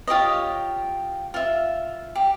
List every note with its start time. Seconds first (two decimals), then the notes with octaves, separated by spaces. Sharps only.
0.08 F4 G4 C#5 D#5
1.34 F4 E5
2.15 G4